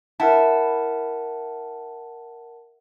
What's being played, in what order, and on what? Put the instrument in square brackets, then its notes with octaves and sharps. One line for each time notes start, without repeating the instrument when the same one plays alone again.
[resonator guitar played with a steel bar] E4 [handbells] A#4 F#5 A5